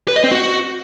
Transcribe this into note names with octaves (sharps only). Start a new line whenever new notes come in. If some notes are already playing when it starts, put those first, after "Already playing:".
B4
D#5
C4
F#4